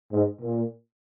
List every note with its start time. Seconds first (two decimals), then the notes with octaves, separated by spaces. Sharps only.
0.12 G#2
0.41 A#2